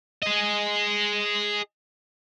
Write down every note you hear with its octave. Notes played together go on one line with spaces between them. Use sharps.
G#4 D#5